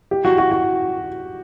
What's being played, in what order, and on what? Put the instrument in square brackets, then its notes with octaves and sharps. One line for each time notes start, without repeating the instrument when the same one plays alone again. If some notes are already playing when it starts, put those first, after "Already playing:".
[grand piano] G4
F#4
F#4
F#4